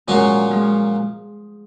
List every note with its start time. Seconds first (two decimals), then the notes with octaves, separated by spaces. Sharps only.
0.07 A#2 F3 F#3 G#3 C#4
0.51 F3 G#3